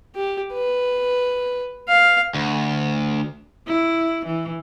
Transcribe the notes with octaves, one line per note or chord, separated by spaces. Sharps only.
G4
B4
F5
D2
E4
E3